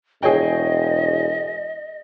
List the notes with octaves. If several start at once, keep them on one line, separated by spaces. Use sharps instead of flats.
E1 G#4 C#5 D#5 G5